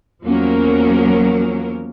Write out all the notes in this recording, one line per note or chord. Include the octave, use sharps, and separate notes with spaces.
E2 F3 F#3 A#3 C#4 A#4